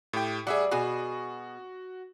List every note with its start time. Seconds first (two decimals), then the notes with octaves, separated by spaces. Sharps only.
0.13 A2 G4 G5
0.47 G3 G#4 E5 F#5
0.71 B2 F#4 G#4